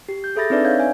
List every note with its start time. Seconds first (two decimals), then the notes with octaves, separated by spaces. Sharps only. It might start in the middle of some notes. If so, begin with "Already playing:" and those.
0.09 G4
0.24 G6
0.36 G#4 A4 E5 B5 A6 A#6
0.50 C4 D4 D#4 B4 D5 E5
0.65 C#5 D5 F5 G6 G#6
0.80 G#5